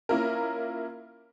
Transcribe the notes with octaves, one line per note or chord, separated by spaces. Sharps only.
A#3 C#4 E4 F4 A#4